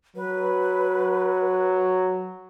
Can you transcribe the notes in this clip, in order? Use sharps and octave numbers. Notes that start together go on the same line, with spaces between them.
F#3 B4